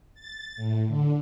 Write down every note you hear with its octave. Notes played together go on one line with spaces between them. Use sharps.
A6
A2
D3